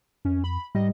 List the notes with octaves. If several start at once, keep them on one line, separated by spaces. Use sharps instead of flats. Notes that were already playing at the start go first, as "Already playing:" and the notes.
F2 C#4
B5
G#2 G3 D#5